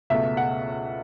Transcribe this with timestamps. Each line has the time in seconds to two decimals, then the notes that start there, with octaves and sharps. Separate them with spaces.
0.10 C#2 B2 A3 E5
0.37 F#5